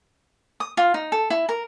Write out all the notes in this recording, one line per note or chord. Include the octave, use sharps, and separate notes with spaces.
D#6
F4
D#4
A4
E4
A#4